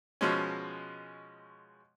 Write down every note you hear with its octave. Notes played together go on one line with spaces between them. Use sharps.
B2 F3 G#3 C#4